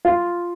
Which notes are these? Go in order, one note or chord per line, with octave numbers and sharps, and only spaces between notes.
F4